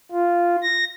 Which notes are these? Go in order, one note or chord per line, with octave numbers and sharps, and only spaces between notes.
F4
A#6